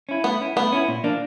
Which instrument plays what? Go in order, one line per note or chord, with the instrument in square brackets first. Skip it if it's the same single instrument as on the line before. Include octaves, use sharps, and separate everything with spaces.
[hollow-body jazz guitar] C#4 E4
[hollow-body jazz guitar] A3 [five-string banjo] B3
[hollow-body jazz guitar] C#4 E4
[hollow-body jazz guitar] A3 [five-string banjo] B3
[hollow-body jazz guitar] C#4 E4
A#2
F3 A#3 D4